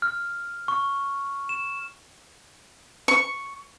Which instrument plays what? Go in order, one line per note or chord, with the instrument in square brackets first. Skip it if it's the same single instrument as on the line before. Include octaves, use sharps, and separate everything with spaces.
[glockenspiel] F6
C#6
E7
[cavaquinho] C#6